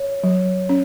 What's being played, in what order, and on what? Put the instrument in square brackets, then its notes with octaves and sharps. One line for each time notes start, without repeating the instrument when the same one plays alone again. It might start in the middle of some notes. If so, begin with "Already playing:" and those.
Already playing: [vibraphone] C#5
[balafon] F#3
C#4